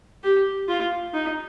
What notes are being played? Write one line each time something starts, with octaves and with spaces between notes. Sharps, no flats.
G4
F4
D#4